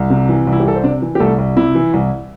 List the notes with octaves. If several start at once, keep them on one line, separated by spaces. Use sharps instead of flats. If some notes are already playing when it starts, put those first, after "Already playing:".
Already playing: C2
C3
E3
C2
E4
G4
C2 A4
C5
C3 D4 D5
E3
G4
C2 A3 A4
C2
C3 E4
E3
C2